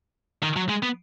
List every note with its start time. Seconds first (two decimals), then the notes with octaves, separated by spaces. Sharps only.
0.43 D#3
0.56 F#3
0.69 G#3
0.83 B3